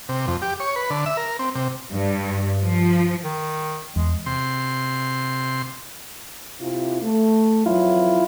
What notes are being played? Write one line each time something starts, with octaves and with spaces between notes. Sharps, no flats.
C3
F2
G4
C#5
B4
D3
E5
A#4
C4
C3
G2
F3
D#3
E2 G#3
C3 C6
C3 E4 F4
A3
F2 E3 F#3 E4 F4